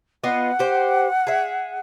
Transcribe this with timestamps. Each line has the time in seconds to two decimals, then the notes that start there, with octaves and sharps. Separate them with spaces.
0.24 B3 F4 D#5 F#5
0.59 G4 C5
1.27 G#4 E5